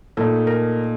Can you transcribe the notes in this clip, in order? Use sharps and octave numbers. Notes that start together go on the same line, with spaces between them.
A#2 A3 D#4 A4
A#4